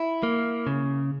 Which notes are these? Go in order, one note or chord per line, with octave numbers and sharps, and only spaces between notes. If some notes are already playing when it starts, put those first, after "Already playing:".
Already playing: E4
A#3
C#3